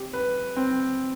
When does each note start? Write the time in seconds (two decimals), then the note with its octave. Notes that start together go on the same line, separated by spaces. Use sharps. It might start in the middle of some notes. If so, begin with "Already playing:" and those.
Already playing: C4 G4
0.13 B4
0.57 C4